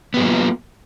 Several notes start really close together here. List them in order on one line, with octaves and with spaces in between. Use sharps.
B3 G4 F#3 A#3 F4